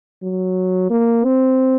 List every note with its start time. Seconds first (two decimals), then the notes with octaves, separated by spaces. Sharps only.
0.23 F#3
0.90 A#3
1.24 C4